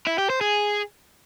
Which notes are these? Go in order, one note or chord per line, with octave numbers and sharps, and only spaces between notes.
E4
G4
C5
G#4